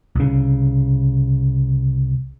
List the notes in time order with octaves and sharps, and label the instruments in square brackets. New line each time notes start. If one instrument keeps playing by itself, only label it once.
[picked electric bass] C2 C#3